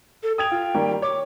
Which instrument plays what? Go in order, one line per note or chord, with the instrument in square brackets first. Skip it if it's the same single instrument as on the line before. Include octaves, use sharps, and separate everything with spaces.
[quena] A4
[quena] G5 [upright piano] D#6 G#6 F7
[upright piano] F4
D#3 G3 A#3
[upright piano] C#5 [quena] D6